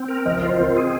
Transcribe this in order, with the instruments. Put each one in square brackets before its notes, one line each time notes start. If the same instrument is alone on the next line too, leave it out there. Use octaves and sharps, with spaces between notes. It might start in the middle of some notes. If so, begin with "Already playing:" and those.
Already playing: [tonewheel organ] C4
A#4
[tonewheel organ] F3 [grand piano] D#5
[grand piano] D#5
[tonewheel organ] F4
[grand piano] C5
[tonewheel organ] C4 [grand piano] A#4
[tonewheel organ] G#4